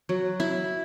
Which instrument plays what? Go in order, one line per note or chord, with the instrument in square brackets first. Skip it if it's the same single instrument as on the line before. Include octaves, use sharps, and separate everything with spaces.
[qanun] F#3
E4